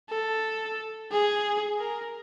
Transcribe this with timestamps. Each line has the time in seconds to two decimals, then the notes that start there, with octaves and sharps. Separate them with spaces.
0.10 A4
1.11 G#4
1.79 A#4